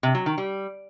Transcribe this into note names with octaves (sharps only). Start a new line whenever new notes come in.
C3
F#3
D#3
G3